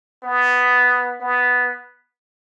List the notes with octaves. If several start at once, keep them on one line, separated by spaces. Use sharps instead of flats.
B3
B3